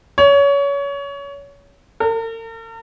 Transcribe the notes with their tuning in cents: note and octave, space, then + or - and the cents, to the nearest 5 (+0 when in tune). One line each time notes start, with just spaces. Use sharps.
C#5 +25
A#4 -45